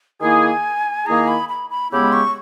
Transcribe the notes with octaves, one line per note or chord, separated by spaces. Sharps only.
D#3 A#3 E4 G#4 G#5
D#3 A#3 E4 G#4 A#5
B5
B5
B5
C#3 G#3 B3 E4 G4 B5
C#6